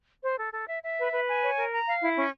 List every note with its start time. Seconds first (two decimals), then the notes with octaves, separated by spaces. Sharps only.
0.23 C5
0.37 A4
0.52 A4
0.67 E5
0.82 E5
0.97 B4
1.12 B4
1.27 G#5
1.42 C#5
1.57 A#4
1.72 A#5
1.86 F5
2.01 E4
2.16 C#4